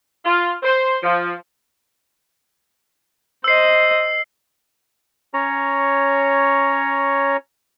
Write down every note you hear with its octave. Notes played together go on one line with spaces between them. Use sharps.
F4
C5
F3
C5 D#5 E6 C7
C#4 C#5 A#5